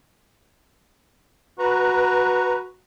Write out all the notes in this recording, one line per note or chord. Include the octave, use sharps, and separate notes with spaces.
F#4 B4 A#5